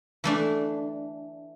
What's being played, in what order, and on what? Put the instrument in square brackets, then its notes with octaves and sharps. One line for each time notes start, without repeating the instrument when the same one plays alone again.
[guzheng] E3 A3 D4